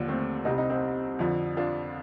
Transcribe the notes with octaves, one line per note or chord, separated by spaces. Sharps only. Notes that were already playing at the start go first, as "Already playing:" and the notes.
Already playing: D#2 D3 F3 D4 F4
A3 C4
C2 C3 G3 C4 D#4
C4 D#4
C4 D#4
F2 D3 F3
D4 F4